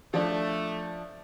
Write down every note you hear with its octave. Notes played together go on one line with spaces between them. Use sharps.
F3 A3 D4